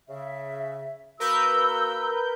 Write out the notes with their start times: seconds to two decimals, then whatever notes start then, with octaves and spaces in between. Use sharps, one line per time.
0.09 C#3 E5
1.20 A#3 F#4 A#4 B4 E6 G6